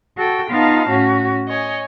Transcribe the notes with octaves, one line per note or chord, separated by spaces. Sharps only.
F#4 A4 G5
B3 D#4 F4 F5 A5
A2 C#4 F#4
C#5 D#5 G#5